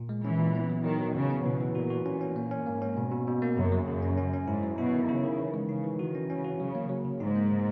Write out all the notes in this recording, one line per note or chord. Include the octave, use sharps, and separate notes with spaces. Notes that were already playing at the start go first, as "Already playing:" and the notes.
Already playing: A#2
G#3
E3 C#4
A#2
B3
F#3
D#3 F#3
F#3
C#3 E3
B3
B2 E3
E3
A#2 F#4
F#4
A#2 C#4
C#4
A#2 A#3
C#4
G#2 A#3
C#4
B2
B2
B2
A#3
F#2 C#3
F#3
F#2 C#3
C#4
C#4
C#4
G#2 E4
F#3
B2 E4
D#3
C#3 E4
D#3
E3
G#3
C#3 D#4
E3
D#3 F#4
C#4
C#3 C#4
F#4
C#3 F#3
A#3
F#3
C#3
G#2 D#4
A#3
C#3